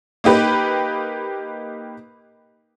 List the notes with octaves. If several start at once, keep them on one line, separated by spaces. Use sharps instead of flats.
A#3 D#4 G4 B4